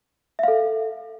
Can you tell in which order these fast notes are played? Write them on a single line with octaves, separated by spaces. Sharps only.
E5 F5 A4